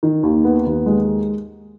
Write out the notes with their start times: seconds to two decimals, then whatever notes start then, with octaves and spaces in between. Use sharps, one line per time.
0.03 D#3
0.23 D#2
0.45 B3
0.66 D#2
0.86 G#3